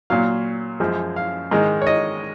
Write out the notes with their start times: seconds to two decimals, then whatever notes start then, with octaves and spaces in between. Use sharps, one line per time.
0.10 A#2 F#3 F5
0.80 F#2 F3 G#3
1.16 F5
1.51 G#2 D#3 G#3
1.82 C#5
1.87 D#5